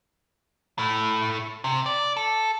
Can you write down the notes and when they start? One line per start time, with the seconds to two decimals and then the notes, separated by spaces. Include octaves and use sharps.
0.78 A2 A3
1.64 C3
1.86 D5
2.17 A4